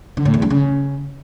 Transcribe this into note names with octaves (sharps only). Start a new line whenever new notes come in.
D3
A2
E2
G2
C#3